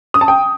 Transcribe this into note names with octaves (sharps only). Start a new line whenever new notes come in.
D#6
A5
G5